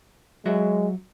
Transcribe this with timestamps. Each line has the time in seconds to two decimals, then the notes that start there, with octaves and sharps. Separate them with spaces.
0.46 F#3 G#3 F#4 E5